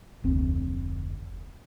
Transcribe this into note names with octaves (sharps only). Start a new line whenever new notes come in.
F1 D2 D3 C4